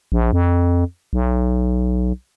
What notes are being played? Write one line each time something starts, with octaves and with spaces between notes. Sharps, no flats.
A#1
F2
B1